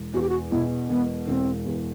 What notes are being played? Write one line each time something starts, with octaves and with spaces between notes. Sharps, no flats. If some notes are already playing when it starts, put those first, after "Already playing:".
Already playing: E1
E2 F#4
G4
F#4
B2 E4
E1 B3
E1 C4
E2